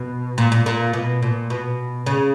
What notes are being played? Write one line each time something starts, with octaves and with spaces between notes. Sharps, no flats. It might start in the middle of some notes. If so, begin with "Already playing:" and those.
Already playing: B2
A#2
A#2
A#2
B2
A#2
B2
C#3